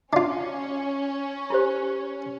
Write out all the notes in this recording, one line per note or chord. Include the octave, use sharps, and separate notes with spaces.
C#4 D4 F4
E4 G4 C5